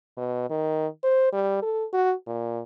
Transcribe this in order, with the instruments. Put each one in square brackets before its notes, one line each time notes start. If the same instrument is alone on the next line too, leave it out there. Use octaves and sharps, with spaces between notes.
[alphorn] B2
D#3
C5
G3
A4
F#4
A#2